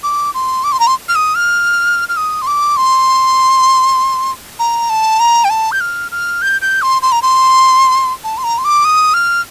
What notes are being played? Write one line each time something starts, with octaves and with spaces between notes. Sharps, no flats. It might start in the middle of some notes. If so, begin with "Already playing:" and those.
D6
C6
D6
C6
A#5
C6
F6
D#6
F6
F6
D#6
C6
D6
C6
A#5
A5
A#5
G5
A5
G6
F6
F6
G6
G6
C6
C6
A#5
C6
A5
C6
A#5
C6
D6
D#6
F6